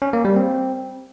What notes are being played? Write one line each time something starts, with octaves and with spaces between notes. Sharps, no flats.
C#4
A#3
G3
C4